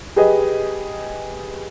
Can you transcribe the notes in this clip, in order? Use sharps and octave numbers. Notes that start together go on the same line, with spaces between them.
G4 G#4 B4 D#5